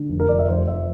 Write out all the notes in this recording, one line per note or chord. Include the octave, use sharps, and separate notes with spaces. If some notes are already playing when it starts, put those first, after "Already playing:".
Already playing: D3
F1
A#4
F1 D5
E5
F1 C5
F1 E5